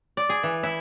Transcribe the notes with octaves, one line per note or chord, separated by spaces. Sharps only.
D5
G#4
E3
E4